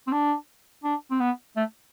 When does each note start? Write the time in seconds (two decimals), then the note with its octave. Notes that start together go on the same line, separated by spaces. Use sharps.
0.07 C4
0.12 D4
0.84 D4
1.10 C4
1.20 B3
1.56 A3